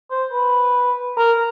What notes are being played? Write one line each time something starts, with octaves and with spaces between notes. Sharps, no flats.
C5
B4
A#4